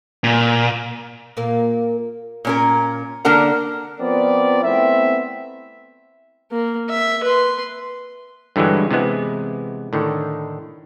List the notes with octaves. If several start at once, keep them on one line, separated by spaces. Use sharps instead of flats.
A#2
A#2 A#3 A#4
A#2 C#4 A#4
D3 A#3 D4 A#4 F#5
F3 B3 C4 A#4 D5
A3 B3 C4 E4 E5
A#3
E5
B4 C6
G2 D3 E3 F#3 G#3
C3 E3 G#3 B3
A2 D3 D#3